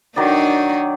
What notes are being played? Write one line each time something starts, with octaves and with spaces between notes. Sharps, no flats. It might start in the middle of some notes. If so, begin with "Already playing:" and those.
D#3 F#3 D4 D#4 D5